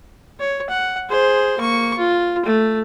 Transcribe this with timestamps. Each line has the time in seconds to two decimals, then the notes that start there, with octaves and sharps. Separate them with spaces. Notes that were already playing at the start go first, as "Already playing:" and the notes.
0.40 C#5
0.69 F#5
1.09 G#4 C5
1.58 A#3 C#6
1.97 F4
2.45 A3